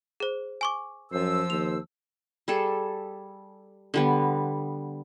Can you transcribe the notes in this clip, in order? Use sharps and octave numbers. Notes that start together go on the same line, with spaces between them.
G#4 C5
G#5 C#6 D6
F#2 F3 C5 E6
D#2 F7
G3 G#4 A4
D3 G3 B3